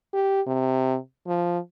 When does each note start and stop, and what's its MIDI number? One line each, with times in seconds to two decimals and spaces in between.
0.13 0.41 67
0.47 0.97 48
1.27 1.59 53